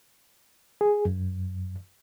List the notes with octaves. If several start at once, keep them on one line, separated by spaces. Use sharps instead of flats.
G#4
F#2